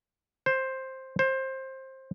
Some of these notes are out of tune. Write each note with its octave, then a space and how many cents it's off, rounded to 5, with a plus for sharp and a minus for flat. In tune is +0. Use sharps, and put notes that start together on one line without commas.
C5 +10
C5 +20